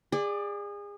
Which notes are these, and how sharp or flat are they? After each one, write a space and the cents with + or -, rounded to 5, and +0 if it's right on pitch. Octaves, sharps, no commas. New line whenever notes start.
G#4 -30 D5 +15